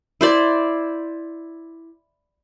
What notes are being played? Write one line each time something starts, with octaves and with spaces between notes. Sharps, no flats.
E4 C5 D5